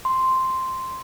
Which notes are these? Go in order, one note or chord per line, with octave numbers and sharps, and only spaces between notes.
C6